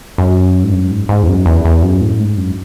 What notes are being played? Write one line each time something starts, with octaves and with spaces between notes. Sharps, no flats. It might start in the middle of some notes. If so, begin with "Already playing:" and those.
F#2
G#2
F#2
G#2
G#2
E2
F#2
E2
E2
F#2
A2
G#2
F#2